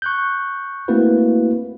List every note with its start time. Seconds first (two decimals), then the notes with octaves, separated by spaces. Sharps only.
0.02 C#6 F#6 G6
0.88 A3 A#3 C4 E4 F#4 B4